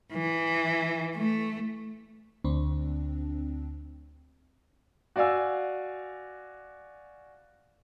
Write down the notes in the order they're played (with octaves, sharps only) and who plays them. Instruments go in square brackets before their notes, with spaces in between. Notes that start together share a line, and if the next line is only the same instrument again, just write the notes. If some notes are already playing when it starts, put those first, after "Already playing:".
[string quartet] E3
A3
[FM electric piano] D2 C4 D4
[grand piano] F#4 D5 F5 G#5 E6